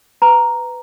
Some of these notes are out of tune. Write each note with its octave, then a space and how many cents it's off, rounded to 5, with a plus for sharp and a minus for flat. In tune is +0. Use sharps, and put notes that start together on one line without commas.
B4 +15 A#5 +0